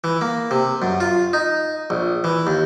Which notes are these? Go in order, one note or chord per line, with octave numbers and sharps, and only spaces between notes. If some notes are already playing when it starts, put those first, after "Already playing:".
E3
A#3
C3
F#2
F4
D#4
A#1
E3
D#2